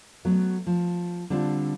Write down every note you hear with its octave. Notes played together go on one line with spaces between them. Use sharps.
F#3 A3 B3
F3
D3 G3 C4 D4 F4